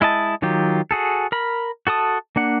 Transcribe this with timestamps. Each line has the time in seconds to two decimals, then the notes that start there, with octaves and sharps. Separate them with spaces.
0.01 G#3 E4 D#5 A5
0.42 D#3 F#3 F4 G4
0.91 F#4 G#4 A4
1.32 A#4 B5
1.87 F#4 A4 A5 D#6
2.36 A#3 D4 F#5